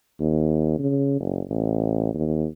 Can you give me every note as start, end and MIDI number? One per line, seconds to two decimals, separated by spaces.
0.20 0.78 39
0.79 1.18 49
1.20 1.42 30
1.50 2.12 33
2.15 2.46 39